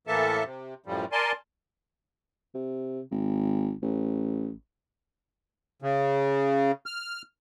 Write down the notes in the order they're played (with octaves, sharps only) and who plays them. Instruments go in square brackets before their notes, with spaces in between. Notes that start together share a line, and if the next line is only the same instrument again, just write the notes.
[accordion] A2 E3 A#3 A4 E5 A5
C3
F#2 A2 F3 G3
A#4 D5 G#5 A5 C6
[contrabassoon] C3
G#1
A1
[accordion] C#3
F6